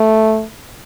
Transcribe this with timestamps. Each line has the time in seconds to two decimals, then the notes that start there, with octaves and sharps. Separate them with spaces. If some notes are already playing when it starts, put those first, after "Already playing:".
Already playing: A3